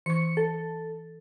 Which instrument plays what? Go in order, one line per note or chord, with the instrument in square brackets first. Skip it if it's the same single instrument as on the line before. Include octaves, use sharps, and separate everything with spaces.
[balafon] E3 C#6 [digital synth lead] C#7
[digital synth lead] A4